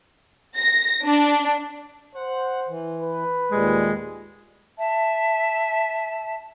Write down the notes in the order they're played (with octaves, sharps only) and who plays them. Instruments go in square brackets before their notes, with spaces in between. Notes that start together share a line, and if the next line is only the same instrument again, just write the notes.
[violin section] A#6
D4
[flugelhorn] C5 [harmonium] F#5
[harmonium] E3
[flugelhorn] B4
[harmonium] D#2 A#2 G3 [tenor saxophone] G#3
[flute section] E5 A5